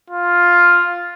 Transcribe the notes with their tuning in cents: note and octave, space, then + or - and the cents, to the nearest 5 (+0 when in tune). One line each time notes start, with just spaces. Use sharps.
F4 +5